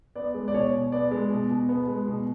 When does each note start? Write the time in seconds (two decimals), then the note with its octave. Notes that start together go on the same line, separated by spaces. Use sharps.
0.16 B3 D5
0.34 G#3
0.48 D5
0.54 B2 C#5
0.73 B2
0.92 B3 D5
1.11 G#3
1.30 B2
1.50 B2
1.69 B3
1.88 G#3
2.07 B2